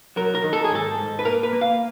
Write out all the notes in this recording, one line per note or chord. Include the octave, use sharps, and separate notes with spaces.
F#3 A#4
A#4
D#3
A4
G#4
G#2 A4
G#2
B4
A#3 A#4
B4
A#3
F5